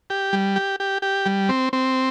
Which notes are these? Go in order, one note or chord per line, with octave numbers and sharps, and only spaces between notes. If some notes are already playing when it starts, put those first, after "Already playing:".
G4
G3
G4
G4
G4
G3
C4
C4